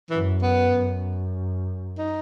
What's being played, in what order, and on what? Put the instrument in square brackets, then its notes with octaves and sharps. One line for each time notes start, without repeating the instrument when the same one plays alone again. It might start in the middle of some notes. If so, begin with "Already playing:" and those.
[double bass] F#2 [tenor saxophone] E3
[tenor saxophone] B3
[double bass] F#2
[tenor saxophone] D#4